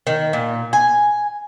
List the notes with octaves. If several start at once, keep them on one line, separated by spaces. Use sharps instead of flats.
D#3
A#2
G#5